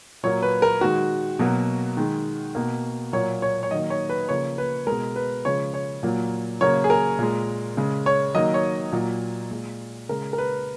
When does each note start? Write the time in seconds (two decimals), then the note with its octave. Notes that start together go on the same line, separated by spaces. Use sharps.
0.23 A#2 F#3 A#3 C#5
0.42 B4
0.62 A#4
0.81 D#3 G#3 F#4
1.39 B2 F#3 A#3
1.97 D#3 G#3
2.55 B2 A#3
3.13 A#2 F#3 A#3 C#5
3.42 C#5
3.63 C#5
3.71 D#3 F#3 A#3 D#5
3.90 C#5
4.09 B4
4.29 C#3 F3 A#3 C#5
4.58 B4
4.87 B2 G#3 A#4
5.16 B4
5.45 C#3 F3 G#3 C#5
5.74 C#5
6.03 A#2 F#3 A#3
6.61 C#3 F#3 A#3 C#5
6.84 G#4
6.90 A#4
7.19 A#2 G#3
7.77 C#3 G#3
8.06 C#5
8.35 D#3 F#3 A#3 D#5
8.54 C#5
8.92 A#2 F#3 A#3
9.51 A#2 G#3
10.09 C#3 G#3 A#4
10.33 A#4
10.38 B4